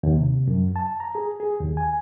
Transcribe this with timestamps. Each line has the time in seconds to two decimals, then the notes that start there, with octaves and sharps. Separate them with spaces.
0.03 D#2
0.16 C3
0.47 F#2
0.76 A5
1.00 A#5
1.15 G#4
1.40 G#4
1.60 D#2
1.77 G#5